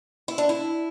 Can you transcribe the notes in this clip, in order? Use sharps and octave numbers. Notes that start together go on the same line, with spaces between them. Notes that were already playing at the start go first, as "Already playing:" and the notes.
E4
D4
E4